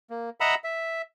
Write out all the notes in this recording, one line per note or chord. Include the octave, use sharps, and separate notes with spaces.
A#3
D#5 E5 F#5 A#5 B5 E6
E5